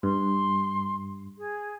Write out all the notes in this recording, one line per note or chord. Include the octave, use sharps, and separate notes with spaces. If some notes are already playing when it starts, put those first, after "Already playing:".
G2 C6
G#4